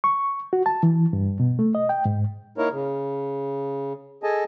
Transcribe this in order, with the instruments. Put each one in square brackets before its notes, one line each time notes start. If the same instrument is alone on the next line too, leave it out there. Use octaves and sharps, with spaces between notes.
[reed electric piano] C#6
F#4
A5
E3
G2
B2
A3
D#5
G5
G#2
[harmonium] A#3 D#4 E4 A#4 C#5
C#3
G#4 A4 D#5 G#5 A5